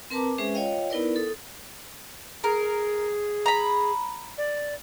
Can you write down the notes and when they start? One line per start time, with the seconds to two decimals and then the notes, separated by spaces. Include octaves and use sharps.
0.11 C4 A#4 B4 A5 A#5 D6
0.23 D6
0.38 G#3 C#4 G#4 B4 C5 E5
0.54 F4 C#5 D#5 F5 G5
0.90 B3 D#4 E4 A#4 B4 D5
1.16 A4 D#6
2.44 G#4 A#4
3.46 A#5 B5
4.38 D5